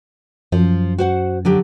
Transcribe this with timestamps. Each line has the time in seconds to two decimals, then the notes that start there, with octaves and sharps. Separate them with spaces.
0.52 F#2 F3
0.98 F#4 C5 F#5
1.45 D3 F#3 G4